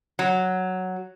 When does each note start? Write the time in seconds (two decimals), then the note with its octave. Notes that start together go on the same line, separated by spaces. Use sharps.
0.19 F#3